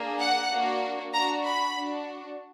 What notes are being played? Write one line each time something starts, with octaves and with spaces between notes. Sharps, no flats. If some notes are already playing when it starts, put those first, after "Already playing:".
Already playing: A#3 D4 G#4
F#5
A#3 D4 F#4
D4 F#4 A#5
B5
D4 F#4